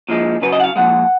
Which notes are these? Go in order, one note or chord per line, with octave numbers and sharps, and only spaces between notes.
A#2 F3 G#3
F#2 C#3 F#3 B4
D#5
F#5
F5
A#2 F3 G#3 F#5